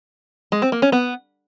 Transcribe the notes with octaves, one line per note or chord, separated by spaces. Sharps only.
G#3
C4
A#3
C#4
B3